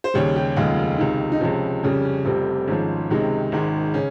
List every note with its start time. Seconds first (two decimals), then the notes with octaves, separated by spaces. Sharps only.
0.04 C5
0.14 D#2 C#3 G3 C#5
0.36 G4
0.56 F1 D#2 C#3 G#3 F4
0.99 C#2 C3 D#3
1.32 D#4
1.41 C#2 C3 F3 C#4
1.83 F2 C#3 G3 C#4
2.05 C#4
2.25 F1 F2 C3 G3 C4
2.68 G#1 G#2 F3 C#4
3.10 C#2 C3 D#3 G#3
3.52 G#1 G#2 D#3 G#3
3.94 C#3 C#4